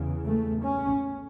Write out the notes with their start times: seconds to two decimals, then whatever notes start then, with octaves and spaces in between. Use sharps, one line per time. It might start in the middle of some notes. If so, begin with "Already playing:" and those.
Already playing: E2 C#3
0.23 A3
0.63 C#4